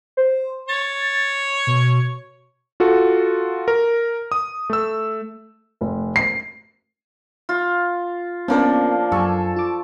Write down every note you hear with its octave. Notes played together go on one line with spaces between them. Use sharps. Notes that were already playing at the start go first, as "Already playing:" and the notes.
C5
C#5 A6
B2
F4 F#4 A4
A#4
D#6
A3 E6
F1
C7
F4
F3 A#3 B3 C#4 D4 A#4
F#2 A4 G#5 C#6
F4 D6